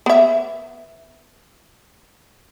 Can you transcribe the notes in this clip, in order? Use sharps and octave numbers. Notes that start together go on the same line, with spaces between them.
B3 E5